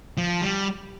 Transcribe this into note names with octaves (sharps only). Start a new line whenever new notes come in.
F3
G3